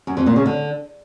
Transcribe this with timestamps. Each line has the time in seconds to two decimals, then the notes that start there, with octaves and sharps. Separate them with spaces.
0.07 F#2
0.17 F2
0.26 A#2
0.36 C#3
0.46 D3